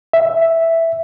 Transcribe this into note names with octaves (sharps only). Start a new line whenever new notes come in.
E5